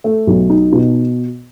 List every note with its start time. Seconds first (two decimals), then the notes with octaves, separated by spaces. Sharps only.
0.04 A3
0.27 B1
0.50 D#4
0.72 B2